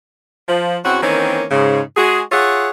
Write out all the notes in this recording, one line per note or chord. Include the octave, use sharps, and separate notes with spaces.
F3
E2 C4 C#4 F#4
D#3 E3 A#3 C4 C#4
G#2 C#3
G#3 F#4 G#4
F4 G#4 C#5 E5 F#5